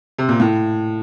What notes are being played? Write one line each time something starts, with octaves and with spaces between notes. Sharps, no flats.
C3
A#2
A2